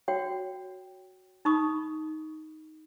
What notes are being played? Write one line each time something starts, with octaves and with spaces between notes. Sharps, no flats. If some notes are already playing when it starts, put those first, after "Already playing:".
F#4 C#5 G5
D#4 B5 C#6 D#6